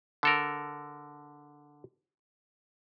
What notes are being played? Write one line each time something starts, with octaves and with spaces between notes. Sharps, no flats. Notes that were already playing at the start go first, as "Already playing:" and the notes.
D3 A4 A#4